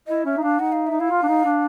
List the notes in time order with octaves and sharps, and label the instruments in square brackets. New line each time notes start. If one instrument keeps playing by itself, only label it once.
[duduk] E4 [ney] D#5
[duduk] C#4 [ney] E5
[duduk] D#4
[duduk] D4 [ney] F5
[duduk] D#4 [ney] F#5
[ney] F5
[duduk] D#4 [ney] E5
[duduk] E4 [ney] F5
[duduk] F4
D4
D#4
D4